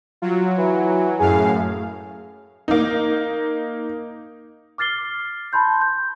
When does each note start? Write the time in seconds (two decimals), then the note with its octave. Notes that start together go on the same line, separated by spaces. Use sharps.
0.22 F#3 F4
0.58 E3
1.20 F#2 A2 G#4 F5
2.68 A#3 D#4
4.78 D6 F6 A6 C7 G7
5.53 A5 B5 C6 G6
5.81 G6